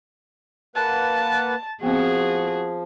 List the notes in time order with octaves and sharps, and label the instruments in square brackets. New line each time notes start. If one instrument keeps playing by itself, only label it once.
[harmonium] A#3 B4 F#5 [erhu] A5
[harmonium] F3 [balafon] B3 C4 [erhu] F#4 [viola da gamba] G#4